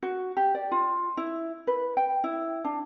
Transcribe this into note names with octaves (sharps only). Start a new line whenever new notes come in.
F#4
G4
D5
F4
E4
B4
G5
E4
D4